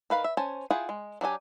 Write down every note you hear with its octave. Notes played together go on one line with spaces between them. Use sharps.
D#3 B4 F5 B5
E5
C#4 C5 G#5 A5
E4 F4 G#4 F#5 G5
G#3
F#3 D4 G4 G#5